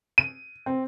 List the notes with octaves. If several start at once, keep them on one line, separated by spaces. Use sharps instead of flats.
D#7
C4